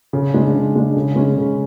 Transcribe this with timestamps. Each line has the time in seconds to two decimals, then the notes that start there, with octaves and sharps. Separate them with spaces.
0.13 C#3
0.34 G#3 D4
0.55 C#3
0.76 G#3 D4
0.96 C#3
1.16 G#3 C#4
1.37 C#3